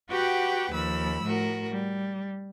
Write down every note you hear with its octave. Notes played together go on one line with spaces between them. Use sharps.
F#4 G4 B4 F#5 G5
D#2 F3 B5 E6
A2 F#4 A#4
G3